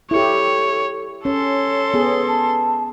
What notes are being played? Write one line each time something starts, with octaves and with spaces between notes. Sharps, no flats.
E4 G4 A4 C#5
C#4 A4 C#5 C6
B3 G#4
A5